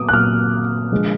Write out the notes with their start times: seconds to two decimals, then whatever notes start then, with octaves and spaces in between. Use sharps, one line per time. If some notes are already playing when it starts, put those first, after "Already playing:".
Already playing: A#2 F#3 D6 D#6
0.09 F#6
0.13 A#2 F#3 F6
0.92 D3 F3 G#3